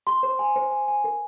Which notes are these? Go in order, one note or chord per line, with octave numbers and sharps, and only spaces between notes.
C6
C5
G#5
C5
G#5
G#5
A#4